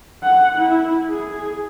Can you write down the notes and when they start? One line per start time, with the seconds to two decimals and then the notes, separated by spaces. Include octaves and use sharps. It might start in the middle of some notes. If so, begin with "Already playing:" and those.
0.23 F#5
0.58 E4
1.10 G#4